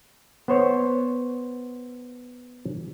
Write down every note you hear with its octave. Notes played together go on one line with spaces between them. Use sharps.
B3 C5 C#5